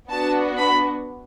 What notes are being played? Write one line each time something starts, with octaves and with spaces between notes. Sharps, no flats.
B3 D4 F#4 A5
B5